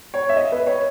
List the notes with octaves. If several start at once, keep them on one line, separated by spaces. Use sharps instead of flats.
C#5
E5
D#5
B4
C#5